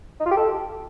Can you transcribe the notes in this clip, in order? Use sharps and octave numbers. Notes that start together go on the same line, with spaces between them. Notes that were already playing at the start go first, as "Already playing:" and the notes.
D#4
F4
G4
A4